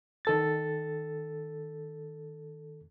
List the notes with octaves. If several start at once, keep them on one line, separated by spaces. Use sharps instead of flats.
D#3 A4 A6